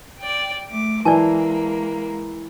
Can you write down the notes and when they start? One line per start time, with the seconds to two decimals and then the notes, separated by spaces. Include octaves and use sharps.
0.19 D5 G5
0.69 A3 D6
1.05 E3 G#3 A#3 D5 G#5 A5